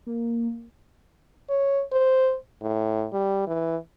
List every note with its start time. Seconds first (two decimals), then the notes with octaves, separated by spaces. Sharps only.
0.06 A#3
1.49 C#5
1.93 C5
2.62 A2
3.13 G3
3.47 E3